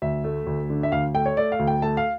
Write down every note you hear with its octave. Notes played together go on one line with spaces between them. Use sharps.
D2 E5
A3
D2
D3
E5
D2 F5
A3 G5
C#5
A3 D5
F5
D2
G5
A3 A5
F5